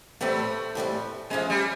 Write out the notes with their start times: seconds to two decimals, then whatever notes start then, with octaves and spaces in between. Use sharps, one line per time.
0.21 A2 E3 G3 A3 C4
0.75 A2 E3 G3 C4
1.30 F3 G#3 A3 C#4
1.50 G3